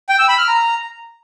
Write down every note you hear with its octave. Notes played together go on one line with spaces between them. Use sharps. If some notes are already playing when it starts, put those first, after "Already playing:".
G5
E6
B5
F6
A#5